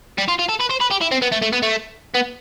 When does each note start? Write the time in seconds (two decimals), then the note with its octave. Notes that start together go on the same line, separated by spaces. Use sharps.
0.18 G3
0.28 F4
0.39 F4
0.49 A4
0.60 B4
0.70 C5
0.80 B4
0.91 G4
1.01 E4
1.11 C4
1.22 B3
1.32 A3
1.42 A3
1.53 B3
1.63 A3
2.15 B3